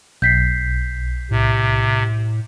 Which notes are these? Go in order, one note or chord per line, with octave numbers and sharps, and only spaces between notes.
B1 G6 B6 C7
A2 C3